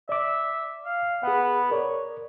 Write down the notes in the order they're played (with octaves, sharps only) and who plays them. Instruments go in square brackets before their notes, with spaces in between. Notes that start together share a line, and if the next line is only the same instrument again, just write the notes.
[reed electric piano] D5 D6 [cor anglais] E5
[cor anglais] F5
[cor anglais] B3 [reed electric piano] G#4 F#5
[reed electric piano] A#4 D5 [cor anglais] C#5